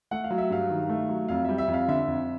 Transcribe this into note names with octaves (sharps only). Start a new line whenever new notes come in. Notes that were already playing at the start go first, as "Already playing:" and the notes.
A3 F#5
F5
F#3
E5
G2 F5
D#3
A3
F#3
F2 F5
G3 E5
E5
F2
F5
D3 E5
F2